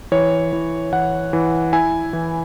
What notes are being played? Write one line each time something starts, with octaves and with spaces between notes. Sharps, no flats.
E3 C#5
E3
E3 F#5
E3
E4 G#5
E3